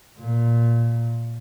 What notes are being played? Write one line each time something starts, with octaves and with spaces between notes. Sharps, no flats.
A#2